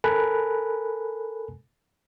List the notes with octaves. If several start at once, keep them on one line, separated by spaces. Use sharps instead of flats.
A4 A#4 G#5 B5 F#6